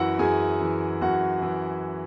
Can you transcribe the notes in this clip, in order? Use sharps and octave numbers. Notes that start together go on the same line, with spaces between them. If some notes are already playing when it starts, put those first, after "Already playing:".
Already playing: F#2 E3 E4 F#4 E5 F#5
F#2 G#4 G#5
E3
F#2 F#4 F#5
E3